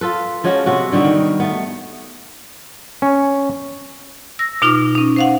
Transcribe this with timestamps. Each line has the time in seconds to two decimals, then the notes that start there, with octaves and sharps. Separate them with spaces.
0.01 F4 A4 B4
0.44 F3 G#3 C#4 F#4
0.66 C3 B3 F#4
0.92 D3 G3 D#4 F#4
1.05 D#3
1.40 A3 B3
3.02 C#4
4.39 E6 A#6
4.62 B2 D#4 F4 D6
4.95 C#4 D#4
5.16 C5 F5 F#5